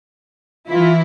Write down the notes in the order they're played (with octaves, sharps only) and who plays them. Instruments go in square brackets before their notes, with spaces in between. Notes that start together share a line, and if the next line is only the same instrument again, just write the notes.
[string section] E3 E4 [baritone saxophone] F4